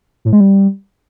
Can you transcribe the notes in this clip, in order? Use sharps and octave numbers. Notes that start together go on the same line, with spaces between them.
A2
G#3
G3